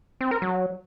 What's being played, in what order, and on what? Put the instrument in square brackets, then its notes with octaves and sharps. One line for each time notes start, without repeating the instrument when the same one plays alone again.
[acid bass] C4
A#4
F#3